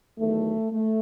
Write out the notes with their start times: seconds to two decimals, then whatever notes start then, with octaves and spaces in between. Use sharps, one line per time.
0.18 E2 D#3 F#3 A3
0.71 A3